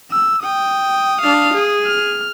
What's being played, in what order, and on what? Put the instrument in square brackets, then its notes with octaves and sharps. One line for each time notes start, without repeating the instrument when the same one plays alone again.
[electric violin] E6
[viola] G5 [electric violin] D#6
[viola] D4 F5
G#4
[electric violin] F6